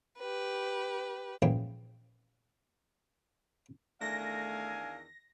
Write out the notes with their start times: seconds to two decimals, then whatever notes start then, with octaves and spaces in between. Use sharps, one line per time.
0.19 G4 B4
1.42 A#1 G#2 E3 A#3 C#4 G5
4.01 E2 D#3 A3 D4 F5 G#5 A#6